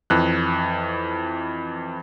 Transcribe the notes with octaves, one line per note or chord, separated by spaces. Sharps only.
F2 E3 F#6